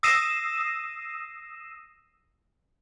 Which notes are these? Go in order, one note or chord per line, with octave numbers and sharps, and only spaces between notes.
D#6 E6 A#6 C7 D#7 E7